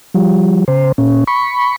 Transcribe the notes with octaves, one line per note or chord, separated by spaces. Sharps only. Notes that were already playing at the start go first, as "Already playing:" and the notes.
F3 G3
C#3 C5
A#2 C#4
B5 C#6